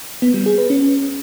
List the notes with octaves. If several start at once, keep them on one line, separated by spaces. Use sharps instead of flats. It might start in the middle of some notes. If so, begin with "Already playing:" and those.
B3
G3
G#4
B4
C#4